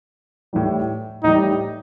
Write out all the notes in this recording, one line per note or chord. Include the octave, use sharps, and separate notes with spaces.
A2 E3 G3
A2 E3 G3 D#4